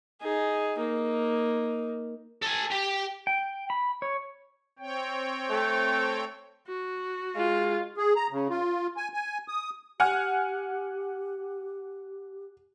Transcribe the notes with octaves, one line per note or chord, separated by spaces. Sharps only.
D#4 G#4
A#3 D#4
A4 G#5
G4
G5
B5
C#5
C4 C#5 G5
A3
F#4
G#3 F4
G#4
A#5
C#3
F4
G#5
G#5
D#6
G4 F#5 G#5 F6